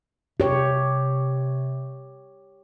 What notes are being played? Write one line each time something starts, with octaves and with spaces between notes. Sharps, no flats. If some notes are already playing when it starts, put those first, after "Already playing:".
C3 G4 C#5